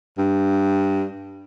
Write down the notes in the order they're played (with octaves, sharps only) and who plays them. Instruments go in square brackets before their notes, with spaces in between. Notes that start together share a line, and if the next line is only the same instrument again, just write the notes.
[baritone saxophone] G2